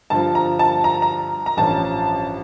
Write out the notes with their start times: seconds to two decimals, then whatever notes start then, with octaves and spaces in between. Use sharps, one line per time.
0.10 G2 D3 F3 A5
0.35 A#5
0.59 A5
0.84 A#5
1.02 A#5
1.46 A#5
1.57 A1 G2 F3 C#4 A5